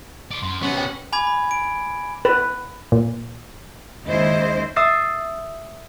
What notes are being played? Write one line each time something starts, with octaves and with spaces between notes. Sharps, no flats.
C5 D5
F#2 C6
C3 B3 C#4 F#5 C#6
C5 E5 G5
G#5 B5 D6 G#6
B5
D7
B4
A#2
D#2 G#2 C#3 E4 C5 D#5
E5 D#6 E6 A6 C7